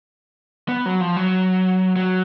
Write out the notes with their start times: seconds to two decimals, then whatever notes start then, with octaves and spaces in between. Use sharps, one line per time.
0.69 B3
0.86 F#3
1.01 F3
1.16 F#3
1.96 F#3